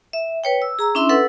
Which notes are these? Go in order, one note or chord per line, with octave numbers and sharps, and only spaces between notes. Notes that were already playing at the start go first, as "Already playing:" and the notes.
E5
B4 C#5 G5
E6
G#4 A#5 E6
C#4 D4 E4 E5 C6
A4 B4 F#5 E6